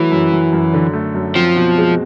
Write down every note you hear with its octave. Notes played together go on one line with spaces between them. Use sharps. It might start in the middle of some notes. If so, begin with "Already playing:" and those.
Already playing: E3 F#3 A3
F#2
F#3
F#2
D3
A3
F#2
F3 C4
B2
G#3